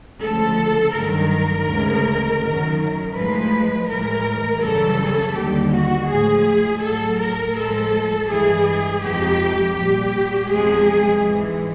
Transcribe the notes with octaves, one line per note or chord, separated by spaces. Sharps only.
D2 C#3 F3 G#3 A4
G2 D#3 F#3 A#4
D2 C#3 E3 G#3
F#2 D#3 F#3
A2 F3 G#3 B4
A2 E3 G#3 A#4
F#2 C#3 E3 G3 A4
D#2 D3 G3 G4
F#4
A2 F3 G#3 G#4
A2 F#3 A4
A#4
A2 F3 G#3 A4
G2 E3 G#3 G#4
F2 C3 F3 G#3 G4
A#2 G3 G4
E2 C3 F3 G#3 G#4
G#2 E3 G#3